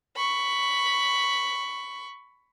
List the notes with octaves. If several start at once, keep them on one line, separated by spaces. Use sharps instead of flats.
B5 C#6